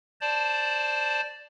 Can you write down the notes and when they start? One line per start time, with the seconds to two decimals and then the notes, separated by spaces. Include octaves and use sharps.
0.21 C5 D5 A5